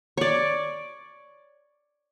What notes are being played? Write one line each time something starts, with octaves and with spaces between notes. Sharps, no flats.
C#5 D5